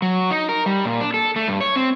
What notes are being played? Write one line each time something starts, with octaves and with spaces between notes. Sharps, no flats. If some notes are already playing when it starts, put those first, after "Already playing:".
F#3
D#4
A#4
G3
A#2
D4
A4
A3
G2
C#5
C4